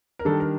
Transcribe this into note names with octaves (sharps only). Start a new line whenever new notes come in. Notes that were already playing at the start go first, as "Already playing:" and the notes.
A#4
D#3 G3 D4 A4
A#4